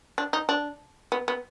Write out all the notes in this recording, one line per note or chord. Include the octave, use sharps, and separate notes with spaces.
D4
D#4
D4
B3
B3